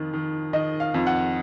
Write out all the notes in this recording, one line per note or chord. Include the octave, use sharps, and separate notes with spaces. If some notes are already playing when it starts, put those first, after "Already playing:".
Already playing: F2 D#3
D#3
D#3 D#5
F5
F2
F#5